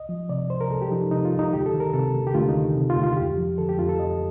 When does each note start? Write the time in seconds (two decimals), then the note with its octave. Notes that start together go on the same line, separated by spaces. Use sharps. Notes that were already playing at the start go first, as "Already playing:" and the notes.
Already playing: C2 D#5
0.09 F3
0.29 C3 D5
0.50 C2 C5
0.61 A#4
0.70 C2 A4
0.82 G4
0.91 F3 D#4
1.11 C3 D#4
1.25 F4
1.32 C2
1.39 D#4
1.53 D2 G4
1.66 A4
1.73 D#3
1.80 A#4
1.94 C3 A4
2.14 D2
2.27 G4
2.34 D2 F4
2.49 D#4
2.55 D#3
2.76 C3
2.90 F4
2.96 D2
3.03 F4
3.17 F2 G4
3.38 F3
3.58 D3 A4
3.69 G4
3.78 F2 F4
3.89 A4
4.00 F2 D#5